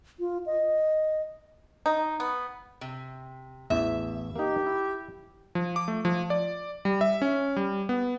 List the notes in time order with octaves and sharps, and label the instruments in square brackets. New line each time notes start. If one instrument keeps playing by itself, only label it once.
[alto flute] F4
D#5
[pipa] D#4
B3
[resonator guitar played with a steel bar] C3
[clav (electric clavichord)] A1 E2 [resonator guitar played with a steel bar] E5
[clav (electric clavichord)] A#3 D#4 [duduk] G4
[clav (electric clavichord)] E4
[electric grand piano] F3
D6
A3
F3
D5
G3
E5
C#4
G3
B3